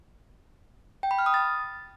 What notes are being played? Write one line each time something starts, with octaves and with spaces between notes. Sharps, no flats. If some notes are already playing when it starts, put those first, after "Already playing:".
G5
B5
F6
D#6
A6